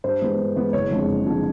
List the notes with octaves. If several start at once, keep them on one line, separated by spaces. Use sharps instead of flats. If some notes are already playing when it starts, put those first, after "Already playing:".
G2 C5
E3 G#3 B3
G2
E3 G#3 B3
F#1 C#5
F2 D3 F3 G#3
F#1
F2 D3 F3 G#3